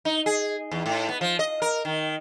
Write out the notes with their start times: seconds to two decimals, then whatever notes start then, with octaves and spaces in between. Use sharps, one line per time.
0.05 D#4
0.26 G#4
0.71 E2
0.86 A2
1.09 B3
1.21 F3
1.39 D#5
1.62 A#4
1.85 D#3